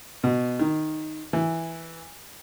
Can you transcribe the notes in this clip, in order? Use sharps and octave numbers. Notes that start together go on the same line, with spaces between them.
B2
D#3
E3